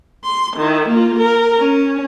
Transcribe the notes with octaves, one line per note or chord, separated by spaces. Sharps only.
C6
D#3 E4
A#3 F4
A#4
C#4